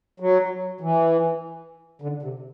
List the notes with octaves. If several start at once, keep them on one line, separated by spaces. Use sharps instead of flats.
F#3
E3
D3
C3